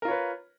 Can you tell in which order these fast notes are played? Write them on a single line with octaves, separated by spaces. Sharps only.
A#4 F4 C#5 B4